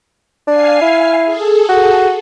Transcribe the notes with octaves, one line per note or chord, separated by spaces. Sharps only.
D4 F5 G#5 C7
E4
G#4 A4
F#4